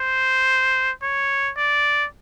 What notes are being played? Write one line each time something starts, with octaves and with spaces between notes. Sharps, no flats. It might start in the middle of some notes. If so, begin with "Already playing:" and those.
Already playing: C5
C#5
D5